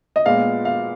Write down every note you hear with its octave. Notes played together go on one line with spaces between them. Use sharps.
D#5
A#2 G#3 B3 F5
F5